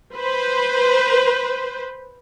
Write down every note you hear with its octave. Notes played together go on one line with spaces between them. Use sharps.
B4 C5